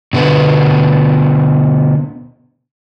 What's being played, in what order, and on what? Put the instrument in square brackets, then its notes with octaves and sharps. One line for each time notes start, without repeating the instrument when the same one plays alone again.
[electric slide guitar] B2 D3 B3